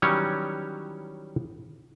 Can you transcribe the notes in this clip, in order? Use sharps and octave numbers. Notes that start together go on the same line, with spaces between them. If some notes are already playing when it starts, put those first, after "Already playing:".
D#3 E3 F#3 G3 C#4 C#5